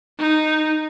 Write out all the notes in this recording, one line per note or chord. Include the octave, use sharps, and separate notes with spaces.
D#4